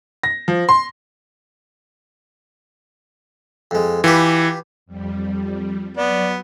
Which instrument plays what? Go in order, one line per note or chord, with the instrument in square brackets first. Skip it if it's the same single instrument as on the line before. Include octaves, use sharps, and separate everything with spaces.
[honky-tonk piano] A#6
F3
C6
[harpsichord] F2 G#3
[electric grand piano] E3 [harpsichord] F4 G4 B4
[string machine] F2 G3
[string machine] F#3 [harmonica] B3 [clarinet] D5